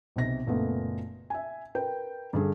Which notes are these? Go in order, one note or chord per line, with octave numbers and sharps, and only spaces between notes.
B1 C3 A#6
F#1 A#2 A3 B3
E5 G#5
A#4 B4 G5
G2 D3 G#4